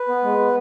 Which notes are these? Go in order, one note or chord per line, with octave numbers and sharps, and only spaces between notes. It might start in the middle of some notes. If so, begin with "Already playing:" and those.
Already playing: B4
B3
G#3
B3